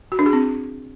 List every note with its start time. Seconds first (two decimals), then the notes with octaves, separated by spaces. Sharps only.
0.12 F#4
0.19 D4
0.26 G#4
0.33 C4